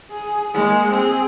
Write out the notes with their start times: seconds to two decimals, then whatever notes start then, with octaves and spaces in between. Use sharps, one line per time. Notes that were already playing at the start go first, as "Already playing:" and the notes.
0.11 G#4
0.54 G#3 A#3
0.91 C4 G#4